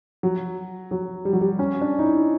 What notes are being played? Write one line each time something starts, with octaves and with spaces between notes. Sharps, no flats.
F#3
F#3
G3
F#3
G3
C#4
D4
D#4
E4